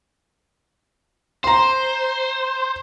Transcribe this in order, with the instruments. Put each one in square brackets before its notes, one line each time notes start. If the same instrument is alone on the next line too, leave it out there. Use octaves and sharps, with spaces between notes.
[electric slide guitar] C5 [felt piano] A#5 C6